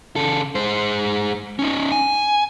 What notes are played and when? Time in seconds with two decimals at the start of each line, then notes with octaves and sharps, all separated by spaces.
0.16 C#3 A4
0.55 G#3 C5
1.59 C#4 D#4
1.92 G#5